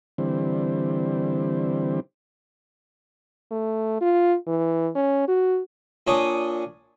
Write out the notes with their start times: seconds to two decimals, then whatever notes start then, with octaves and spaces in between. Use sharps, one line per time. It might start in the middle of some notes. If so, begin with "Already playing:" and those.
0.18 D3 E3 G3 C4
3.51 A3
4.01 F4
4.47 E3
4.95 C#4
5.28 F#4
6.07 A#2 D4 C#5 G#5 D#6